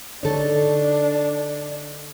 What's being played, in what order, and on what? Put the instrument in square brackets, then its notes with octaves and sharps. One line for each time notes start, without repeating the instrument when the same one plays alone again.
[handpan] D3 C#5 [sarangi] D4 [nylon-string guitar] D#4 A4